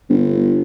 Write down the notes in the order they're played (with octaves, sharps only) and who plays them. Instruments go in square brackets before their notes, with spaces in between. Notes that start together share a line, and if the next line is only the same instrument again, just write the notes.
[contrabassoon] G1